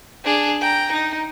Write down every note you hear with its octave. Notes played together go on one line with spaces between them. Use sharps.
D4 G#4
G5 A#5
D#4